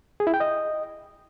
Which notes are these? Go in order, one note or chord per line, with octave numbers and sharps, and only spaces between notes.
G#4
E4
G5
D#5